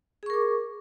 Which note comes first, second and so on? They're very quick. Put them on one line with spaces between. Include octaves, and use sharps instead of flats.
G#4 C#6 A#4 D6